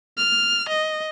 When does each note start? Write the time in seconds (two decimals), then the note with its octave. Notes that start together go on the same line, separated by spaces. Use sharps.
0.17 F6
0.69 D#5